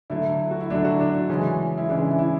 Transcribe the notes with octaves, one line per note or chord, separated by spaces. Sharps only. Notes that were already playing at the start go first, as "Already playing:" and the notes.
D3 F#3 A3 E4
F#4
E4
D3 F#3 A3 D4
F#4
D4
D4
C#3 E3 G#3 C#4
E4
C#3 E3 G#3 D4
E4
E4